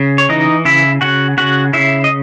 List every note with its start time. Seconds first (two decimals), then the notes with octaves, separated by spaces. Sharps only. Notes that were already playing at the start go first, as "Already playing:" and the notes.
Already playing: C#3
0.18 C#5
0.29 E3 D#4 D#5
0.65 C#3 E4 E5
1.01 C#3 F#4 F#5
1.37 C#3 F#4 F#5
1.73 C#3 E4 E5
2.04 D#5